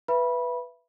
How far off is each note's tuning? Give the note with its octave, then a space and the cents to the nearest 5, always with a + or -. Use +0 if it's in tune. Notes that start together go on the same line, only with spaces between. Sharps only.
B4 +0 E5 +25 B5 -20